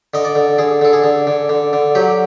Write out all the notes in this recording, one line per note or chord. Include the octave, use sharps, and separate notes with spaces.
D3 D#5
D5
D3
D3 G#4
D3 A4
G#4
D3
D3
D3
D3
F#3 G4